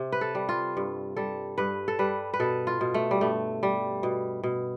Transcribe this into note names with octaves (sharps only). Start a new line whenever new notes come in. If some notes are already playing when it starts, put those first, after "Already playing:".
Already playing: C3
B4
A4
G3
F4
G2
G3 A4
G2 B4
A4
G3 B4
B4
B2 A4
F4
B2
A3
G3
G2 A3
G3
B2
B2